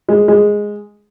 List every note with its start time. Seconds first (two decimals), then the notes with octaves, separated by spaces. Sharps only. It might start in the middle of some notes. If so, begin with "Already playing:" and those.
0.08 G#3
0.28 G#3